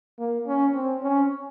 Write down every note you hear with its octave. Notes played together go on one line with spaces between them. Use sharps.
A#3
C#4
C4
C#4